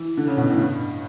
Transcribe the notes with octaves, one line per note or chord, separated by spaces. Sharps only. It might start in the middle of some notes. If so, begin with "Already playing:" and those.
Already playing: E3
D3
C#3
B2
A2
G2